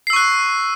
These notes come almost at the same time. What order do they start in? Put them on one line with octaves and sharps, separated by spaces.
C7 E6 C#6 F#6